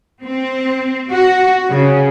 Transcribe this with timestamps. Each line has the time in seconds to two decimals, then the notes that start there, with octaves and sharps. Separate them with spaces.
0.25 C4
1.11 F#4
1.70 C#3